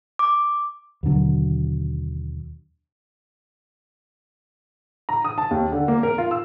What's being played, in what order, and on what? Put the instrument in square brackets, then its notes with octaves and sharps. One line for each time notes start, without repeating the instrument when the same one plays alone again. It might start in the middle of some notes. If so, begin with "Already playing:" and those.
[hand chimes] D6
[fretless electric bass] D#2 B2 D3 F#3
[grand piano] A#5
D#6
A5
D#2
D3
A#3
A#4
F4
E6